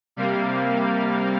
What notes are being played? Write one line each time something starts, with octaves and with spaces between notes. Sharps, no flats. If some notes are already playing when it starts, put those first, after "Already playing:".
C3 G3 A#3 F5